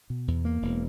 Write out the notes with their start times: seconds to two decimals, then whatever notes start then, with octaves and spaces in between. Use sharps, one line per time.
0.10 B2
0.28 E2
0.45 A#3
0.62 E1